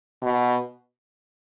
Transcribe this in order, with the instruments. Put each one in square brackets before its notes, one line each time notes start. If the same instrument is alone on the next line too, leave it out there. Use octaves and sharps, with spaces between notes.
[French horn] B2